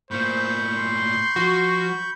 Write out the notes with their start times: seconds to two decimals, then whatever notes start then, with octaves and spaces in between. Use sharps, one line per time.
0.11 A2 A#3 C5 B5 C#6 G6
0.64 C6
1.36 F3 F#4